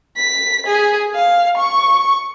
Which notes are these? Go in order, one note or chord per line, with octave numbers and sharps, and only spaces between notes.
B6
G#4
F5
C#6